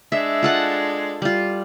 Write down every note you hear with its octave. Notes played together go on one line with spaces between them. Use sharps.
G#3 D4 E5
F4 A4 F#5
G3 F4